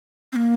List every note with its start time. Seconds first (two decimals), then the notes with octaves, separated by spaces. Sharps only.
0.33 C4
0.36 A#3